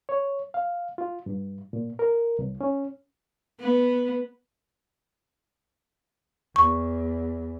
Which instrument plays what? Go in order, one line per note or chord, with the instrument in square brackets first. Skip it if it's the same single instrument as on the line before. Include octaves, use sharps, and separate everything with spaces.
[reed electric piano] C#5
F5
F4
G2
A#2
A#4
C2
C#4
[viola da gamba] B3
[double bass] E2 [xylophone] C#6